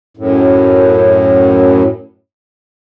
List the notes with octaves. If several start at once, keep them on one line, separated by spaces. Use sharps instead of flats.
F#2 A2